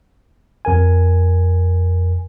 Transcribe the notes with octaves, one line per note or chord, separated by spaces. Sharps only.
F2 A#4 G#5